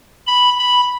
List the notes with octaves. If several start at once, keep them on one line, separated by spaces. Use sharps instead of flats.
B5
B5